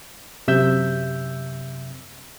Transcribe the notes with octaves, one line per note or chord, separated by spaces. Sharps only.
F#2 C3 E5 E6 G6